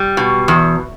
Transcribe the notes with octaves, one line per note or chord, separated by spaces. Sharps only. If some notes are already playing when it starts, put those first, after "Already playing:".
Already playing: G3
B2
E2